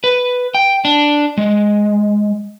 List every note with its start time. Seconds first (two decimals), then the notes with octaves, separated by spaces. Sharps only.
0.04 B4
0.54 G5
0.85 D4
1.38 G#3